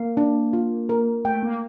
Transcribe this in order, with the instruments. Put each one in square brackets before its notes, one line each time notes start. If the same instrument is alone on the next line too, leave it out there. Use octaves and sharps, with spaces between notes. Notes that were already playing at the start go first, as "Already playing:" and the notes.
Already playing: [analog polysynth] A#3 [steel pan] F5
[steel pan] D4
F4
A#4
[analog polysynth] A3 [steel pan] G5
[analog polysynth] A#3